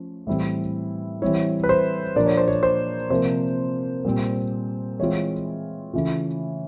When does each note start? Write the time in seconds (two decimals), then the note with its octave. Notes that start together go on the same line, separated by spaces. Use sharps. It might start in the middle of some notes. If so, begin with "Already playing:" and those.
Already playing: F3 A3 C#4
0.27 A2 E3 G3 C4 E4
1.22 E3 G3 C4 E4 C#5
1.64 B4
1.69 C5
2.16 A#2 F3 A#3 D4 D5
2.26 C#5
2.37 C5
2.48 C#5
2.63 C5
3.10 C3 F3 A#3 C5
4.05 A#2 G3 C4
5.00 E3 G#3 C4 F4 C#5
5.93 C#3 E3 A3 C#4 F4